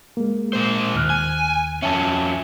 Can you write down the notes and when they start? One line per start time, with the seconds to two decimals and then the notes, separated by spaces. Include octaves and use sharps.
0.17 G#3 A#3
0.53 A#2 C5
0.95 D#2 F6 F#6
1.10 G#5
1.82 F2 C#4 E5 G#5 A5